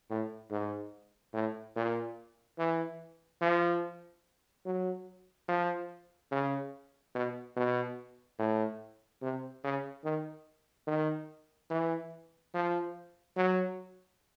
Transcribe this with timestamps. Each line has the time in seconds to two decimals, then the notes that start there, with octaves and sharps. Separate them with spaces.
0.10 A2
0.51 G#2
1.33 A2
1.76 A#2
2.58 E3
3.41 F3
4.66 F#3
5.48 F3
6.31 C#3
7.15 B2
7.56 B2
8.39 A2
9.22 C3
9.64 C#3
10.04 D#3
10.87 D#3
11.70 E3
12.54 F3
13.37 F#3